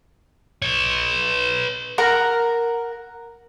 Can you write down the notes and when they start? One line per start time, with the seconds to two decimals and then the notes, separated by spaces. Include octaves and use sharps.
0.62 B4 C#5
1.98 A#4 F#5 A#5